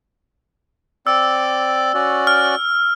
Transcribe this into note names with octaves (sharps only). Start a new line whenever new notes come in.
C4 D5 D6 E6
C#4 F#4 D5
F6